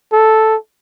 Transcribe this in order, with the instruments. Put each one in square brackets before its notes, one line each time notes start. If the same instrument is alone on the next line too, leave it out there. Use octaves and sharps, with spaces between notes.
[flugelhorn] A4